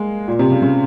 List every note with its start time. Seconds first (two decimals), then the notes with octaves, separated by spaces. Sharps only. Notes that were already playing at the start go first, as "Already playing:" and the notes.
Already playing: G#3 A#3
0.28 A#2
0.39 C3
0.51 C#3
0.62 C#3